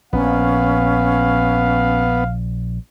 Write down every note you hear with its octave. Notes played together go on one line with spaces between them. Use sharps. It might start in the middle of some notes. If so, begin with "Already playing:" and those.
A#1 B3 C#4 F5